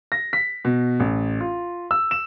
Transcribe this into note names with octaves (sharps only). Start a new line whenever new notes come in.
A#6
B6
B2
A1
F4
E6
E7